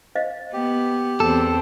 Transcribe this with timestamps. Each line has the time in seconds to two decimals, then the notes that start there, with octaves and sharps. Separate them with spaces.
0.15 C5 D#5 F5
0.53 B3 G4
1.20 E2 C4 A4